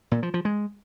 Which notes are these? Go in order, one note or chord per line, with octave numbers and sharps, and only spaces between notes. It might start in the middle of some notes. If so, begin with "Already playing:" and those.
A#2
F3
F3
G#3